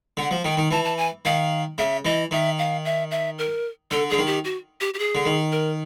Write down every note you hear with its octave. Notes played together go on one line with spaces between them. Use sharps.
D3 F#5
F3
D#3 G5
D#3
E3 A5
A5
G#5
D#3 F5
C#3 E5
E3 D#5
D#3 E5
F5
E5
E5
A#4
D3 A4
D3 G#4
D#3
G4
F#4
G4
G4
G#4
D3
D#3
A#4